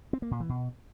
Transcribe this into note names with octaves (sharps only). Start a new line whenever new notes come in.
C4
A#3
A#2
E3
B2